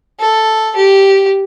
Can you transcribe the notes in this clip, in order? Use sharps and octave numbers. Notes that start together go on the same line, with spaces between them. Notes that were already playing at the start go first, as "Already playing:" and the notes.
A4
G4